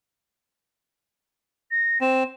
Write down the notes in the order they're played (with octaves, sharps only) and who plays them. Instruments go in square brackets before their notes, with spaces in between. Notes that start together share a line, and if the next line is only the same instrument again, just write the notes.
[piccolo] A#6
[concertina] C4 [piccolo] E7